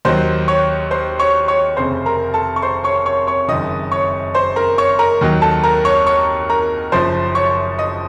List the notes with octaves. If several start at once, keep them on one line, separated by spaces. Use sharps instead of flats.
D#2 D#3 F#3 C5 C6
C#5 C#6
C5 C6
C#5 C#6
C#5 C#6
F1 F2 C#3 C5 C6
A#4 A#5
A4 A5
C#6
C5 C6
C#5 C#6
C#5 C#6
C#5 C#6
F#1 F#2 D#3 D#5 D#6
C#5 C#6
C5 C6
A#4 A#5
C#5 C#6
A#4 A#5
D#2 D#3 F#3
A4 A5
A#4 A#5
C#5 C#6
C#5 C#6
A#4 A#5
F#1 F#2 F3 C5 C6
C#5 C#6
D#5 D#6